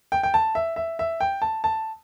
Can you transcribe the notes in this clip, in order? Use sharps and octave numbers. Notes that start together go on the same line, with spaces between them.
G5
G5
A5
E5
E5
E5
G5
A5
A5